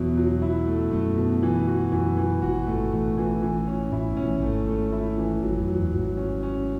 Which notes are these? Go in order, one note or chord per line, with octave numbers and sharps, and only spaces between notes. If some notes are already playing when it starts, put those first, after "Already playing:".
Already playing: E2 B2 F#3 E4
F#3
E4
A3
F#2 A3
B2
E3
F#4
F#2 E3
E3
G#1 G#2 F#4
G#1 G#2 A3
A1 A2 A3
E3
E3
C#4
A1 A2 E4
B1 B2
C#4
A1 A2
G#1 G#2 A3
A3
E4
E3
G#1 G#2 F#3
F#2
F#3
E2
G#1 G#2 F#3
C#4
C#4